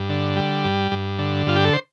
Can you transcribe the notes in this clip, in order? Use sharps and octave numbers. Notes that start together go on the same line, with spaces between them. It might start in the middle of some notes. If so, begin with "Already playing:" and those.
Already playing: G2
D3
G3
G2
G2
D3
G2 F4
G4
A4
C5